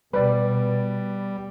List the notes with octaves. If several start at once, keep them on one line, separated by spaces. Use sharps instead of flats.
B2 G3 B4 D5